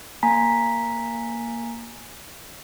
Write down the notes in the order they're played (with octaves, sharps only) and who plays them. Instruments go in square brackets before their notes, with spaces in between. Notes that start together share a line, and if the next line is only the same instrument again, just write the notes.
[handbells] A#3 G#5 A#5 B6